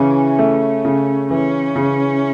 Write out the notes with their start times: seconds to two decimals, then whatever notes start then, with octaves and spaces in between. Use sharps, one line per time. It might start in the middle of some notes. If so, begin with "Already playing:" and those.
Already playing: C#3 E3 C#4
0.39 A3
0.85 C#3
1.30 E3 C#4
1.76 C#3